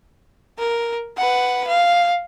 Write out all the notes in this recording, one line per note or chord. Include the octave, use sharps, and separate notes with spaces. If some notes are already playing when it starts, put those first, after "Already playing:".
A#4
B4 F#5
F5